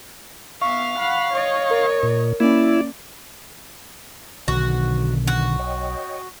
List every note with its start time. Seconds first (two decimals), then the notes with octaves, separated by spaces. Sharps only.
0.61 B3 E5 F5 C#6
0.98 F#5 B5
1.33 C#5 D#5
1.70 A#4
2.03 A#2
2.40 A#3 C#4 E4 D5
4.48 B1 B2 D3 D#3 F#4
5.27 F#4
5.59 C#5 D#5 G5